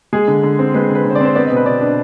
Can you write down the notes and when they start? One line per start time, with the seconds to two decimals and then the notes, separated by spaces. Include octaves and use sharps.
0.13 G#3 G#4
0.28 D3
0.43 D3
0.59 C4
0.74 G#3 B4
0.89 D3
0.95 B4
1.05 D3
1.10 C5
1.15 D5
1.21 C4 C5
1.35 B3 D5
1.45 D#5
1.51 B2
1.56 B4
1.66 B2 D5
1.81 D4
1.87 B4